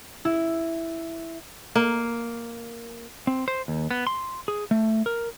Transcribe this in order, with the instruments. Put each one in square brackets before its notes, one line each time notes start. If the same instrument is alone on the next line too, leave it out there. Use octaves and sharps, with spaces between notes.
[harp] E4
[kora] A#3
[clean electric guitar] C4
C5
D#2
B3
C6
G#4
A3
A#4